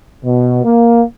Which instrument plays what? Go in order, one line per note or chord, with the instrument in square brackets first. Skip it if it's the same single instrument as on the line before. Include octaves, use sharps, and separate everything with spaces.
[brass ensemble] B2
A#3